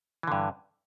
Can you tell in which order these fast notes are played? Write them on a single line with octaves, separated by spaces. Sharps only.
E3 D3 G2